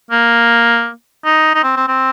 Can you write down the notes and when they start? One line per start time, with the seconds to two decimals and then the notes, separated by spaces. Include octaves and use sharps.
0.11 A#3
1.25 D#4
1.55 D#4
1.63 C4
1.76 C4
1.88 C4